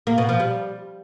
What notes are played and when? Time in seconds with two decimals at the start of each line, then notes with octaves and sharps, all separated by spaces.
0.07 A#3
0.18 B2
0.29 F3
0.40 G3